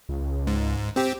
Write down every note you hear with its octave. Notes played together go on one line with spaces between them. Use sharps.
C#2
G#2
C4 G4